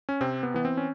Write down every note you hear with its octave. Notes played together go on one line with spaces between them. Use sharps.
C#4
C3 C4
B3
E3 B3
C4
C#4